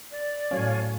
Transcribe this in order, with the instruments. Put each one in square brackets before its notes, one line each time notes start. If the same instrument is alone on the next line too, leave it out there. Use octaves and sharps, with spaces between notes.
[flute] D5
[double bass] A2 [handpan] F#3 C#4 [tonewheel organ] C#5 F5 G#5